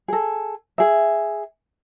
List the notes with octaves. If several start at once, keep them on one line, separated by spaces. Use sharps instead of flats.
G#4 A4
G#4 E5